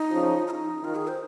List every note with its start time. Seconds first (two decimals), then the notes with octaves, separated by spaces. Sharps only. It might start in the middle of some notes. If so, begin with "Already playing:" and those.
Already playing: D#4
0.11 C#3 F3
0.47 F4
0.51 D#4
0.84 D#3 F4
0.95 G#4
1.08 C5